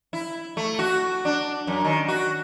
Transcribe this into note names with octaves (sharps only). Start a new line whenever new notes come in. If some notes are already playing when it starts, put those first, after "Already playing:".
E4
A3
F#4
D4
F#2
D#3
F#4